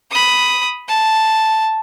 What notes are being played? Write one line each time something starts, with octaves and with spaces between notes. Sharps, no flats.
B5 D#6
A5